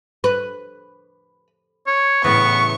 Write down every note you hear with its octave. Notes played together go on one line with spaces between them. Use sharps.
B4
C#5
A2 C#3 E3 B3 C#6